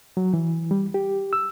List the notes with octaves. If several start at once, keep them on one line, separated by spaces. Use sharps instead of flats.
F#3
E3
G3
G4
E6